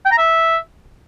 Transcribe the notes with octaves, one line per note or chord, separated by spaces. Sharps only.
G5
A#5
E5